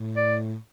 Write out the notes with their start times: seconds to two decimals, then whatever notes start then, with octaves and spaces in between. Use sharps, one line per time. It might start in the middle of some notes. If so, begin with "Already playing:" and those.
Already playing: A2
0.17 D5